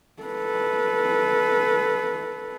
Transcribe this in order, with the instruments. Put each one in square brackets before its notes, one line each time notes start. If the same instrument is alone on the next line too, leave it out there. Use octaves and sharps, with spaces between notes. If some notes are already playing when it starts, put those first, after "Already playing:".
[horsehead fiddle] A4 B4